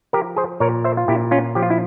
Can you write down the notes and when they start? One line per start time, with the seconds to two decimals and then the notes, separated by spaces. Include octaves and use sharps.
0.13 F3 G4 A#4
0.36 G#4 C5
0.60 A#2 A#4 C#5
0.84 C5 E5
0.97 F4
1.08 A#2 E4 G4
1.31 C#4 F4
1.55 F3 G4
1.62 F4
1.70 E4